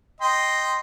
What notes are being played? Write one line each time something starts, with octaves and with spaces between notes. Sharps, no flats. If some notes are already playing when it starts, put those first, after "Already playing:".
D#5 G5 C6